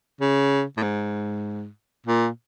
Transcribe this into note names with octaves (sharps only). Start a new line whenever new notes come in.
C#3
A2
G#2
A#2